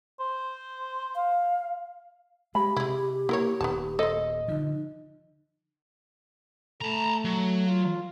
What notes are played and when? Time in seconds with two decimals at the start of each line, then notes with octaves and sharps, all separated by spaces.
0.20 C5
1.15 F5
2.55 G#3 G4 B5
2.76 C3 G#3 E4
3.29 A#3 E4 A#4 C#5
3.61 D#1 B3 D#4 A5
3.99 A4 C5 D#5
4.48 D3 F3 D#4
6.82 A3 A5 A#5
7.25 F#3
7.67 F4